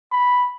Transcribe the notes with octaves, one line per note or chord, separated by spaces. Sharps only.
B5